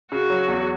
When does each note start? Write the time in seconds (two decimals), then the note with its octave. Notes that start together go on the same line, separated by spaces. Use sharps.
0.11 C#3 F#4
0.30 F#3
0.48 E2